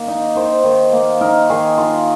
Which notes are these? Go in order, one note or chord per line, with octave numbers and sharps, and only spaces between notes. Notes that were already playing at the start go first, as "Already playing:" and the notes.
Already playing: D#3 A#3 D#5
D#4
D#3 C5
D#3
A#3
D#4 A#4
D#3 G#4
D#3 F4